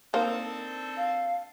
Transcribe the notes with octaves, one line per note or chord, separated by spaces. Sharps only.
A#3 C4 D4 D#4 A4 A#4 C5
F5